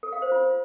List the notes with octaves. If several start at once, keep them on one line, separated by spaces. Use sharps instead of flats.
A4
F5
C5
F4